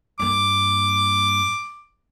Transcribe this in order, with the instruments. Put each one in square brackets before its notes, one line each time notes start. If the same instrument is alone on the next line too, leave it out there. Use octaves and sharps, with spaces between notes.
[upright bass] G2 A#3 [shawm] D6